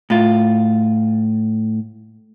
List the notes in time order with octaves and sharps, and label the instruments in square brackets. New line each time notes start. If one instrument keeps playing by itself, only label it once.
[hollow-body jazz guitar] A2 F4